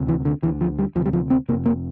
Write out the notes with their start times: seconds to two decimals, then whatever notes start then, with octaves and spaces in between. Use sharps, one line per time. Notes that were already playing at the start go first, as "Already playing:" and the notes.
Already playing: D2 C3
0.09 E3
0.25 D3
0.42 D2 D3 E3
0.61 F3
0.79 G3
0.95 D2 F3
0.99 C3
1.06 G3
1.13 F3
1.30 C4
1.49 F1 E2 C3 A#3
1.66 A#3